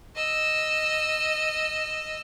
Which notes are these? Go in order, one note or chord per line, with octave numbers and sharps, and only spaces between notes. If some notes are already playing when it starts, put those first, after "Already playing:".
D#5 E6